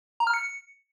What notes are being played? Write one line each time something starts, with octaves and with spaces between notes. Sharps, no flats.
A#5
F6
C#7